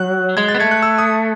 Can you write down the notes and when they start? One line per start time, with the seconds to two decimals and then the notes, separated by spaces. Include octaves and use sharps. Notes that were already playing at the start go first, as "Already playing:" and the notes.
Already playing: F#3 F#6
0.37 G#3 G#6
0.49 A6
0.54 B3
0.60 A3 G#6
0.71 F#6
0.83 E6
0.98 D#6